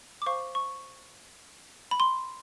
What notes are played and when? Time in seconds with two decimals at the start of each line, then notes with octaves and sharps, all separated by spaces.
0.22 D6
0.26 C5 F5 C#6
0.55 C#6
1.91 B5
2.00 C6